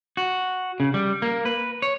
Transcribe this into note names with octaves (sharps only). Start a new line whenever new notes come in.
F#4
C#3
G3
A#3
B4
C#5